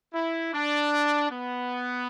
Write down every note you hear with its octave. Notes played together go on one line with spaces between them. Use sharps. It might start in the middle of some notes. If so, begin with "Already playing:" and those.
E4
D4
B3